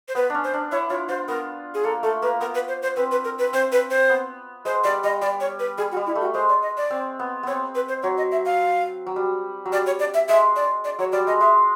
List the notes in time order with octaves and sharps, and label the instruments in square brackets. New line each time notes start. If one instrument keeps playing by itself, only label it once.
[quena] C5
[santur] B3 [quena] B4
[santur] C#4 D4
[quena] C5
[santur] D4
[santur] E4 [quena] C#5
[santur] F4 [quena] C#5
[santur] F4 [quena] C5
[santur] B3 [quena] A#4
[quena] G#4
[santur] A#3 [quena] A4
[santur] A3 [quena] A4
[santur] A#3 [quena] B4
[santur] B3 [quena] A#4
[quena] B4
C5
C5
[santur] C4 [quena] B4
[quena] B4
A#4
B4
[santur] C4 [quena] C5
[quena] B4
C5
[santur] B3
[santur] G#3 [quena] C5
[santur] G3 [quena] D5
[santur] G3 [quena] D#5
[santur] G3 [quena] D5
[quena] C#5
B4
[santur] G3 [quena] G#4
[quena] F#4
[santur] G3
[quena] E4
[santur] A3
[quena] F#4
[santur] G#3 [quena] C5
[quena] D5
D#5
D5
[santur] C4
B3
[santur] B3 C4 [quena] C#5
[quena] B4
C5
[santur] F#3 [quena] C#5
[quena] D#5
E5
F5
[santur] F#3
G3
F#3
[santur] G3 [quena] D5
[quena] C#5
D5
E5
[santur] G#3 [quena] E5
[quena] D5
D5
[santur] F#3 [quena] C#5
[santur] G3 [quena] D5
[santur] G#3 [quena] D#5
[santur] G#3 [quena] E5